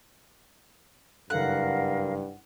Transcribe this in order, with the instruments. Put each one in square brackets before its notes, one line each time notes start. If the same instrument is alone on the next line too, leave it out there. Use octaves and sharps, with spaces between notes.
[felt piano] F#1 A4 [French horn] G2 [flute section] A#4 F5 [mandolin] F#5